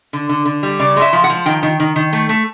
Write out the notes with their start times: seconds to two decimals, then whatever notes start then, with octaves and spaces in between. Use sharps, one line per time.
0.13 D3
0.29 D3
0.46 D3
0.63 G3
0.79 C#3 D5
0.96 G#3
1.02 E5
1.13 F3
1.24 F#5
1.30 F3
1.46 D#3 G5
1.63 D#3
1.80 D#3
1.96 D#3
2.13 A3
2.29 A3